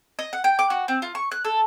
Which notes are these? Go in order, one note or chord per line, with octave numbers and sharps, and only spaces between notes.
D#5
F#5
G5
D6
F#4
C4
F4
C#6
F#6
A4